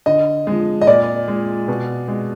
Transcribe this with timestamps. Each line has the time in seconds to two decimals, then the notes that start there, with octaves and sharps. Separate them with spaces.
0.06 D3 D#5
0.47 F3 G#3
0.81 D#5
0.87 A#2 D5
1.28 G#3
1.68 B2
2.08 G#3